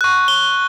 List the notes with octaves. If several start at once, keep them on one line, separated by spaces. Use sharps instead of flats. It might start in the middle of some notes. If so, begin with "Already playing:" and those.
C#6 F#6
G7